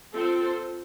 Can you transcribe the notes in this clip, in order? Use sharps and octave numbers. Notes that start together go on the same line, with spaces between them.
C4 F4 A4 C5